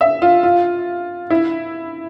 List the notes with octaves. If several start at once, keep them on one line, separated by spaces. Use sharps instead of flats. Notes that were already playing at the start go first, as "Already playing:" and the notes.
E5
F4
F4
E4